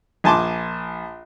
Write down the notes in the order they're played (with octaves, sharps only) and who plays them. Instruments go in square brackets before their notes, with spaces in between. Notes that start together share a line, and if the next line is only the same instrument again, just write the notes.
[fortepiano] A#1 G#5 A5 C6 D6